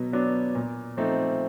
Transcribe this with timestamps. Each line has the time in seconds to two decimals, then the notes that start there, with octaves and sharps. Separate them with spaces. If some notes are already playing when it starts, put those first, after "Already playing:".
Already playing: B2 F#3 B3
0.13 F#3 B3 D4
0.55 A#2
0.97 F3 A3 C4 D#4